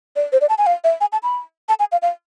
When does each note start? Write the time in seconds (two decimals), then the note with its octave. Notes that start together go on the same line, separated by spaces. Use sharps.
0.16 D5
0.32 C5
0.41 D5
0.49 A5
0.58 G#5
0.67 F5
0.84 E5
1.01 G#5
1.12 A5
1.23 B5
1.69 A5
1.79 G#5
1.92 F5
2.02 F5